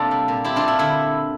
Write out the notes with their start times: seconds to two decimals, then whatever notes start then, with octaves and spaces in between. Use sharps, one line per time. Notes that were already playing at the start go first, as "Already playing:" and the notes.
Already playing: C3 A#3 D4 F4 A4
0.11 G3
0.28 A#2
0.44 C4 E4 G4
0.56 D4 F4
0.62 A#2
0.68 E4
0.79 D3 E4